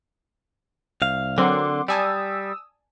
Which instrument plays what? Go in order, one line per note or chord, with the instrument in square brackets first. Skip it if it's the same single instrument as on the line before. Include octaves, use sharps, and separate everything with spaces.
[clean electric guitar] C2 F5
[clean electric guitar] D3 [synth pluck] F#3 C4 A#4 [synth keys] F#5 C6 D6
[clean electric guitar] G3 [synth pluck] D5 G#5 A5 [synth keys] D#6 E6